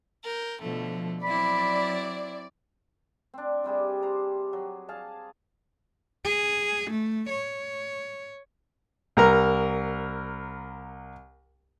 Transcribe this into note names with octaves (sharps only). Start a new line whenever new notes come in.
A#4 G6
B2 D3 F3 A3
F#3 C4 E4 D5 B5
C4 D4
C3 G3 G4 G#4
C5 A#5
F#3
G#4 F5 A5
G#4
A3
C#5
C2 A#4 A#5